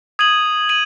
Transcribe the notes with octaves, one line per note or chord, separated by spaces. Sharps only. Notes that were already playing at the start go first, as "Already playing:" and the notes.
D#6 G#6 D#7 F#7
D#7 F#7